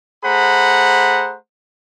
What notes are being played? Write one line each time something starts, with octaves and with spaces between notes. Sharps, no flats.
A3 G#4 C5 F#5 A#5 B5